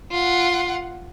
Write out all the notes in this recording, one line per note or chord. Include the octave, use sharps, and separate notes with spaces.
F4 F#5